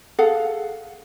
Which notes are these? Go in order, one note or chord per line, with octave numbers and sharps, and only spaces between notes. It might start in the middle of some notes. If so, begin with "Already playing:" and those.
G#4 A4 F5 F#5